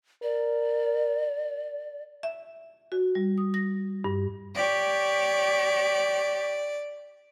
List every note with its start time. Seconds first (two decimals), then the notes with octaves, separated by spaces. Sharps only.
0.23 A#4 D5
2.23 E5
2.92 F#4
3.15 G3
3.38 D#6
3.54 A#6
4.04 G2
4.55 G4 C#5 D5